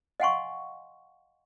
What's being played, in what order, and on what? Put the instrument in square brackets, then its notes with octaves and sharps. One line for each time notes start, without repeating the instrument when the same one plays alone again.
[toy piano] D#5 F5 F#5 G#5 C6 C#6